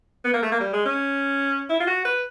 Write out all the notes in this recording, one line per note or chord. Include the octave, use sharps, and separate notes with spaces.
B3
A#3
A3
A#3
G3
G#3
C#4
E4
F4
F#4
B4